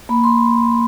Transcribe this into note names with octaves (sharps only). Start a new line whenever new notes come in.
A#3 B5
C6